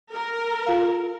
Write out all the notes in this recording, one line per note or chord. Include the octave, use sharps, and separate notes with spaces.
A#4
F4 F5